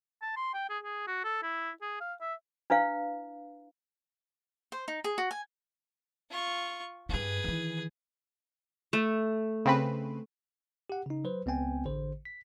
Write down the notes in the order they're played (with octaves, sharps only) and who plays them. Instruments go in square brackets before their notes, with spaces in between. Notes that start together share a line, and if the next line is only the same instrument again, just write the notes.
[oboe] A5
C6
G5
G#4
G#4
F#4
A4
E4
G#4
F5
E5
[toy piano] D4 E4 B4 F5
[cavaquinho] C5
D#4
G#4
F#4
G#5
[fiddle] F4 C#6
[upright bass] G2 D#4 [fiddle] G#4 B4
[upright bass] D#3 E3
[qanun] A3
[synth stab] C#3 C4 B4
[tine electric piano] G4 F#5
C#3 D#4
F#3 B4 C5
C#2 B3 C4 G5 G#5
A1 D3 C5
B6